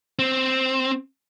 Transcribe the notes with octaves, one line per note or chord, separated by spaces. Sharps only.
C4